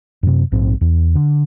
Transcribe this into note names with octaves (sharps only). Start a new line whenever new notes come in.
F#2 C3
A#1 G#2 C4
E2
D3